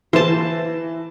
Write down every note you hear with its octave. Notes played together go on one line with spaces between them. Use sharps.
E3 C5 A5